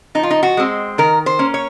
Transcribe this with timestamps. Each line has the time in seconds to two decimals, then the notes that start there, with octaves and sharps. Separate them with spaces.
0.15 F3 D#4
0.23 F4
0.31 D#4
0.43 F#4
0.57 G#3 C4
0.98 D#3 A#4
1.26 C5
1.39 A#3 C#4
1.54 C#5